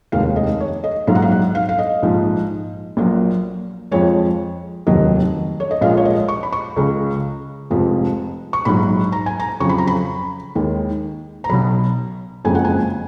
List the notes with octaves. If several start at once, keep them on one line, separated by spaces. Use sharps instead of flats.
F1 D#2 D#3 G#3 F5
D#5
C#5
D#5
A#1 G#2 F#3 F5
F#5
F5
F#5
F5
F5
D#5
A#1 G#2 F3 G#3
A#1 A#2 F#3
F2 F3 G#3 C#5
F1 D#2 D#3 F#3 D#5
C#5
D#5
A#1 A#2 F3 G#3 F5
C#5
D#5
C#6
B5
C#6
C#2 C#3 G#3
F1 F2 F3 G#3
C#6
A#1 G#2 F#3 B5
A#5
G#5
A#5
F2 C#3 F#3 C#6
B5
A#5
B5
D#2 D#3 G#3
A#5
B1 B2 F#3 B5
F#1 F2 C#3 G#3 G#5
F#5
G#5